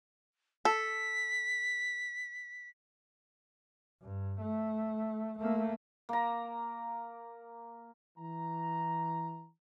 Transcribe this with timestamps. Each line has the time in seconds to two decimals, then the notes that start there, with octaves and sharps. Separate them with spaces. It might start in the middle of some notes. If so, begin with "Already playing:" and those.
0.65 A4 B6
4.03 G2
4.41 A3
5.39 A3 A#3
6.09 A#3 A#5
8.18 E3 A#5